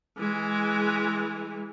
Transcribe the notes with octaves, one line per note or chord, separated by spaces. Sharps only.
E3 G#3